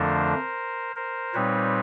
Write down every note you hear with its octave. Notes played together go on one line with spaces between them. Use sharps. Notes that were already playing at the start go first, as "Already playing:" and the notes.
Already playing: F2 D3 F3 A3 D4 A#4 C5
A#4 C5
A#2 G3 C4 D#4 B4 C#5